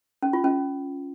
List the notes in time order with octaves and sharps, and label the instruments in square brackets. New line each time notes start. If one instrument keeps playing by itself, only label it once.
[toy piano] C#4
F4
C#4